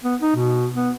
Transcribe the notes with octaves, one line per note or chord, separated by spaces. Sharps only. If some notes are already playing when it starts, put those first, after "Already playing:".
B3
D#4
B2
B3